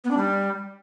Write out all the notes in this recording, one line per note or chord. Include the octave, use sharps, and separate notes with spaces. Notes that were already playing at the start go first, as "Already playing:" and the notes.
B3
D4
G3